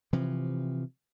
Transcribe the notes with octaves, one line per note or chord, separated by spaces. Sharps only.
C3 E3 F3